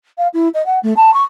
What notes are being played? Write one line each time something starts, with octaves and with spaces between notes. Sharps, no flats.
F5
E4
D#5
F#5
A3
A5
C#6